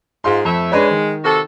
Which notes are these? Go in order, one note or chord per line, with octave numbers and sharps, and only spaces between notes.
G#2 F4 C6
F2 A3 E5
G#3 D4 B4 C#5
D#3
C3 F#4 A4